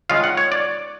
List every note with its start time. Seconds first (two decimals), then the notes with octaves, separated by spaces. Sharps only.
0.10 D#3 G#3 C#4 F4 F5
0.24 F#5
0.37 C#5
0.52 D5